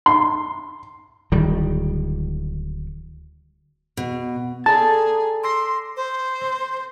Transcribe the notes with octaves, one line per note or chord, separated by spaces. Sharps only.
C6
D1 D#3 G3
B2
G#4 A4 D5 A5 A#5
C6 D6 E6 A#6
C5
C4